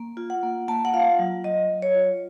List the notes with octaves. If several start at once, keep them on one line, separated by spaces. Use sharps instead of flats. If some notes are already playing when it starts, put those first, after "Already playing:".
Already playing: A#3
F4
F#5
A#3
A#3 A5
F#5
F4 F5
F#3
F#3 D#5
F#3
C#5
F4